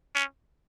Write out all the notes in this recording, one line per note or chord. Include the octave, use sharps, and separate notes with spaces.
C#4